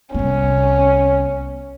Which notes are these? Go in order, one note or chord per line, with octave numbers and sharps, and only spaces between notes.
C2 B3 C#4